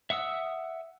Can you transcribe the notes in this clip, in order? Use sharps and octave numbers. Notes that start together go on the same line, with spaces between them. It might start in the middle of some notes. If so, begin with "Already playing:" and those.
E5 F#5 D#6 E6